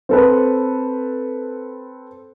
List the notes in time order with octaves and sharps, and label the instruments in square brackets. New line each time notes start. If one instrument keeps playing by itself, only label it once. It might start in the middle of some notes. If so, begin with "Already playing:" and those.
[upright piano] C4 A4 B4